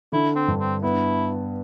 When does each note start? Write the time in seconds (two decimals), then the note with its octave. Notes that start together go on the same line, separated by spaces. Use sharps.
0.12 D3 E4
0.36 C4
0.48 G2
0.59 C4
0.82 B3 E4